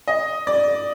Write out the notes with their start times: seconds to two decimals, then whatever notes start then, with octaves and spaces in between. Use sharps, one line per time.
0.08 D#5
0.47 D5